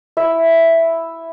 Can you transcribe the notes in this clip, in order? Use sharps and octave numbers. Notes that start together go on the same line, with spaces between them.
E4 E5